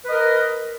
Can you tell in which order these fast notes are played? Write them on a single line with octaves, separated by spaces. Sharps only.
B4 D#5 A#4